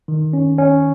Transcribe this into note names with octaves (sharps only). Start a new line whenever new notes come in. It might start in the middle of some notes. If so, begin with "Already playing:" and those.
D#3
C#4
C#4